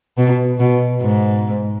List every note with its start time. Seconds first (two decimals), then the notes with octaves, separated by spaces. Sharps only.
0.18 B2
0.60 B2
1.02 G#2